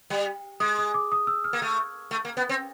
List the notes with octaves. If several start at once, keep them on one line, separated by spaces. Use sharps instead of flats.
G3
G#3 D#6
D#6
D6
D#6
E6
F6
A#3
A3
A3
A#3
B3
C4